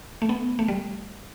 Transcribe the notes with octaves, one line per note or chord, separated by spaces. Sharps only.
A3
B3
A3
G3